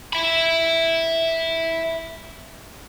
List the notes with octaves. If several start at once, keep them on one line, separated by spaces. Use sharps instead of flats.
E5 B5